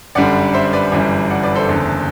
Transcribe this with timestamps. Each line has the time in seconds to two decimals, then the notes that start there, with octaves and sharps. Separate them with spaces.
0.15 G1 F#2 D3 G3 D5 F#5
0.53 C5 E5
0.65 E5
0.73 B4 D5
0.92 G1 F#2 E3 G3
1.30 D5 F#5
1.43 B4 D5
1.56 A4 C5
1.69 F#1 E2 D3